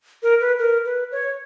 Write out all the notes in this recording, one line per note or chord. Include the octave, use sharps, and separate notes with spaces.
A#4
B4
A#4
B4
C#5